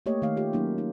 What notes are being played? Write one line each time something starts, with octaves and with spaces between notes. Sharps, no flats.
A3 A#3 G4 C#5 D#5
D#3 A3 F5
F4 G4
F#3 A#3 C#4 D#4
D#4